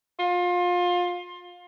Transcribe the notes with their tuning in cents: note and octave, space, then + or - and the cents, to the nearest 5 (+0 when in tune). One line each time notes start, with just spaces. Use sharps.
F4 +25